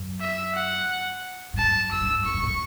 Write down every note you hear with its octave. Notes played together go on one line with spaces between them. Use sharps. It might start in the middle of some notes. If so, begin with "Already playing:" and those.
Already playing: F#2
E5
F#5
G2
F#2 A5
F#2 E6
G2
F#2
F#2 C#6
G2
A2